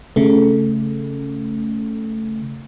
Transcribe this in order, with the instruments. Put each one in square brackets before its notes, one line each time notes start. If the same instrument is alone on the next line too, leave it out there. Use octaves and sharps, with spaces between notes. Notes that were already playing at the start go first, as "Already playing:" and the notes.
[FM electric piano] C#3 A3